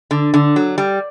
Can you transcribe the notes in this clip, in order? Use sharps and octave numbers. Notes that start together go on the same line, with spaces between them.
D3
D3
F#3
G3